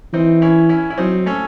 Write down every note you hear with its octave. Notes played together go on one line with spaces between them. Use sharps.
E3 C4 D#4
C#4 E4
C#4 E4
E4
F#3 C4 D#4
A3 C#4